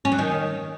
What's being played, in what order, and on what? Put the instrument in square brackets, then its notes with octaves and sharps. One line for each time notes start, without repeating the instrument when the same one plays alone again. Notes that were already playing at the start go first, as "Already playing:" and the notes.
[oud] C#4
F#3
D#3